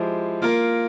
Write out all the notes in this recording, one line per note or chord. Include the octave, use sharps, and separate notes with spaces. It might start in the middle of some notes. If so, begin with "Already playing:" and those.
Already playing: F3 G#3 E4 G4 C5
A#3 F4 A#4